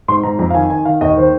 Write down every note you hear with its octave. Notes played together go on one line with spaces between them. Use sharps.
G#2 C6
G#2 A#5
F2 A#5
F5
D#3 G#5
D#3 G#5
D#3 F5
D#2 D#5
D#3 C5